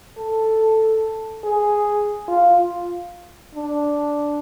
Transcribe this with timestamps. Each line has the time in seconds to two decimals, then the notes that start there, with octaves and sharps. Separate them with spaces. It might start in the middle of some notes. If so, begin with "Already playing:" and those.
0.18 A4
1.44 G#4
2.28 F4
3.55 D4